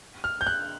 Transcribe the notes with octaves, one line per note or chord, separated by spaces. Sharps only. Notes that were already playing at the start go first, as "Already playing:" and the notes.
F6
G6
F#6